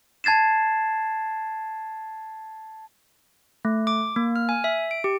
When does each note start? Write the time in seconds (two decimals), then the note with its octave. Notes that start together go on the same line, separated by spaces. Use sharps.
0.24 A5 G#6 A6 C7 E7
3.65 A3
3.87 D6
4.16 A#3
4.36 F6
4.49 G#5
4.64 E5
4.91 D7
5.04 G4